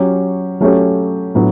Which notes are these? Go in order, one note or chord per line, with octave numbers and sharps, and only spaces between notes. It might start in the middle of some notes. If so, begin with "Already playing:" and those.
Already playing: F#3 C#4 G4 C#5
F#3 A3 C#4 G4 C#5
A2 F#3 B3 D4